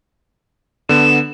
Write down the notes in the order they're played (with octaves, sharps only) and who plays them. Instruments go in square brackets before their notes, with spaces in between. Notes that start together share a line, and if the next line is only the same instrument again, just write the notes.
[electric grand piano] D3 B3 [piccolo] E7